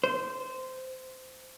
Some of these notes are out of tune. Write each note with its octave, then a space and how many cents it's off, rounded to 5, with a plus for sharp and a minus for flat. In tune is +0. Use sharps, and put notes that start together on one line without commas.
C5 -15